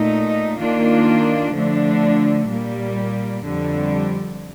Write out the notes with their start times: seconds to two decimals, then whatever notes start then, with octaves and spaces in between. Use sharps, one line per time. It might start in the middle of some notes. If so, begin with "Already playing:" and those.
Already playing: A#2 A3 D#4
0.59 D#3 A#3 D4 F4
1.54 D3 F3 A3 D4
2.49 A#2 G3 A#3
3.44 F2 D3 G3